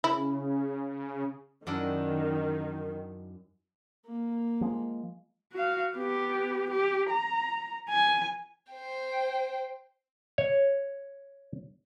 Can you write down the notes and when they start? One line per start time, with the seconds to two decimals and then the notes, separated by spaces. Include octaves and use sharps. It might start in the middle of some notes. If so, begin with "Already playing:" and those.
0.04 C#3 E4
1.67 F#2 D#3 D4 E4
4.06 A#3
4.61 F3 G#3
5.53 F#4 F5
5.94 B3 G4
6.70 G4
7.10 A#5
7.89 G#5
8.72 C5 G5
10.38 C#5